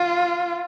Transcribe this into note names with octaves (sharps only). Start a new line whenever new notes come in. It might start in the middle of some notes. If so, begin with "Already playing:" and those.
Already playing: F4